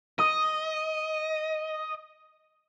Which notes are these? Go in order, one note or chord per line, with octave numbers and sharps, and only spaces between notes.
D#5 D#6